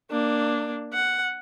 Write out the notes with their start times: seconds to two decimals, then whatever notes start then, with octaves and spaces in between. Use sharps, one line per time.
0.11 A#3 D4
0.93 F#5